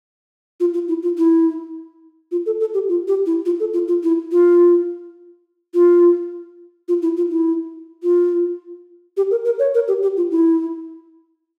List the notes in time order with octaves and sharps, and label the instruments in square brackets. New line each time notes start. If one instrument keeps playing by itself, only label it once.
[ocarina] F4
F4
E4
F4
E4
F4
A4
A4
G4
F4
G4
E4
F4
A4
F4
F4
E4
F4
F4
F4
E4
F4
E4
F4
G4
A#4
A#4
C#5
A#4
G4
G4
F4
E4